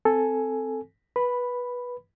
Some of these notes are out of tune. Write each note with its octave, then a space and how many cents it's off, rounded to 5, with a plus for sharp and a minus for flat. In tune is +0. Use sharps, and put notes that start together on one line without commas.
C4 -10 A4 +0 G#5 +5
B4 -15 B5 +0